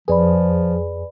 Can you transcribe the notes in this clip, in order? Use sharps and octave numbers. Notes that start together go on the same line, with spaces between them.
F2 F3 G#4 B4 D5 B5